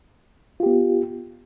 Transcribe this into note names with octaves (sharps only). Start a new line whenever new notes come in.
B3 F4 G4